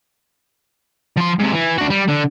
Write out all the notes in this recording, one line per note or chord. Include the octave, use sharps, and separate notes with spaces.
F3 C6
G#2 C3
E3
D4 F#4
G3
D3